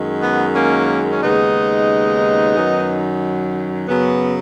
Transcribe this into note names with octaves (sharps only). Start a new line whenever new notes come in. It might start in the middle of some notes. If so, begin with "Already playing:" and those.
Already playing: F#2 D#3 G#3
B3
A#3 C#4
C#4
D#2 C#3 G#3 B3 D#4
F#2 D#3 F#3
F#2 C#3 F#3 B3